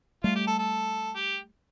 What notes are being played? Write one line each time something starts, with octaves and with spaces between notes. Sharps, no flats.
G3 A3 F4
G4
A4
A4
G4